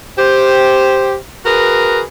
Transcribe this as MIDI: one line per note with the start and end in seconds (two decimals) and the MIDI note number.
0.18 1.14 67
0.18 1.14 72
1.45 2.01 66
1.45 2.01 68
1.45 2.01 70
1.45 2.01 71